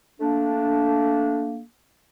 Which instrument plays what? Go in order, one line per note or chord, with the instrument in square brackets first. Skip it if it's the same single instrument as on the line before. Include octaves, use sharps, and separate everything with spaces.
[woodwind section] A3 A#3 D4